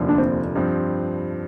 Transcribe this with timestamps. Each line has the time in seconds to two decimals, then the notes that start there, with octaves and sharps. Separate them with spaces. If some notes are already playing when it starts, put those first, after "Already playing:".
Already playing: F1 D#2 D3 F3
0.09 D4
0.18 C4
0.55 G2 F3 C4